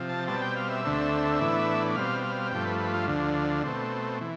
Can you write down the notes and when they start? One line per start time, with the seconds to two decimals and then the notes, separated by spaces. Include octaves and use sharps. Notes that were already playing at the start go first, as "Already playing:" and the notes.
Already playing: C3 F3
0.09 A5
0.28 B2 G3 C4 A5
0.42 G5
0.56 F5
0.70 E5
0.84 D2 D3 A3 C4
1.40 A2 E3 B3 D4
1.96 B2 G3 C4 F5
2.23 F5
2.51 G2 F3 A3 G5
2.66 B4
2.79 B4
2.94 F4
3.08 D2 D3 F3
3.63 B2 A3 C4
4.21 E3